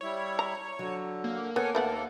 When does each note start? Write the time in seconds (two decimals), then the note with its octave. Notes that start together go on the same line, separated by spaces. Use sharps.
0.01 G3 E4 C#5
0.39 A#5
0.79 D3 F#3
1.24 A#3
1.56 B3 A4 A#4 C#5 G#5
1.75 D#2 A3 B3 A4 F#5